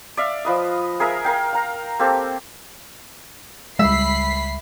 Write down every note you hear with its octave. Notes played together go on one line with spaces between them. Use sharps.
D5 E5 F5
F3 B4 D#5
G#4 A#4 E5 F5
A#4 F5 G5
F5 A#5
A#3 C4 G4 A4
C#2 G3 G#3 E5 B5 B6 C7